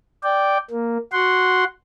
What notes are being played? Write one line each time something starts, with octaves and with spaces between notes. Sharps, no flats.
D5 G5
A#3
F#4 F#5 C6